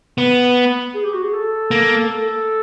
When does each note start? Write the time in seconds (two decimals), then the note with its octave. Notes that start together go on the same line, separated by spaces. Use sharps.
0.18 B3
0.94 G#4
1.04 G4
1.14 F#4
1.23 G#4
1.33 A4
1.71 A#3
2.10 A4